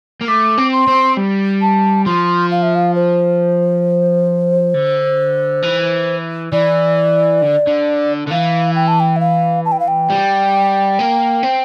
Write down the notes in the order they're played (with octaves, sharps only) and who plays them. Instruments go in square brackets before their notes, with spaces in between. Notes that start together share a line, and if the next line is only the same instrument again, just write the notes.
[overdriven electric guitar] A#3
[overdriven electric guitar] A3 [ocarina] D6
[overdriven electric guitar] C4
[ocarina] C6
[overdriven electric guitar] C4
G3
[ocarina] A5
[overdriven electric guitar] F3 [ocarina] C6
[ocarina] F5
E5
F5
C5
[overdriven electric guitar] D3
E3
[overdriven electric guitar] E3 [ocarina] D5
[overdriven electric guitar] D3
D3
D3
[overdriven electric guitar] E3 [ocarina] F5
[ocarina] G5
A5
G5
E5
F5
A5
G5
F5
G5
[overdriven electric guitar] G3
A#3
C4